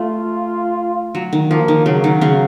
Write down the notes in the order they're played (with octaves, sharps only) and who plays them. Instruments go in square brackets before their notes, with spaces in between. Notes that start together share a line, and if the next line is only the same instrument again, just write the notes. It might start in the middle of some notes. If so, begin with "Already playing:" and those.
Already playing: [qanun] A3 [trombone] F4
[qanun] F#3
D#3
[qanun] F3 [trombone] A#3
[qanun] D#3
[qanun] C#3 [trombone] F#3
[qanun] D#3
C#3 C#4